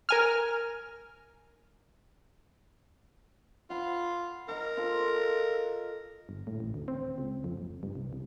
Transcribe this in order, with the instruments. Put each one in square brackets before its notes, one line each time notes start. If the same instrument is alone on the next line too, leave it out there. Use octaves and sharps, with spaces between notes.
[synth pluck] A#4 G#5 F6
[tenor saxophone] F4 [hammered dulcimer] F#5 B5
[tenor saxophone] A#4 [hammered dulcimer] D#5 A#5
[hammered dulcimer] F4 A4 C6
[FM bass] G1
A2
A1
D2
C4
C#2
F2
F#1
G2
C2
C2